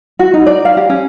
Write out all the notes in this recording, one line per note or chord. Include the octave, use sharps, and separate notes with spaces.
F#4
D#4
D5
F5
G4
C#4